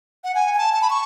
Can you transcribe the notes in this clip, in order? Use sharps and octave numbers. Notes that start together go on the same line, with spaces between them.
F#5
G#5
G#5
A5
A5
B5
C#6